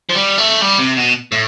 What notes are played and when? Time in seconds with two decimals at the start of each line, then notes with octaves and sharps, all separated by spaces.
0.10 F3
0.15 G3
0.38 A3
0.61 G3
0.79 C3
0.97 B2
1.32 A2